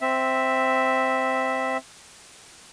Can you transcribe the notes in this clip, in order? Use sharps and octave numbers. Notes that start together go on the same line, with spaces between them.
C4 E5